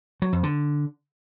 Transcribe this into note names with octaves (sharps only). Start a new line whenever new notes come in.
F#3
F2
D3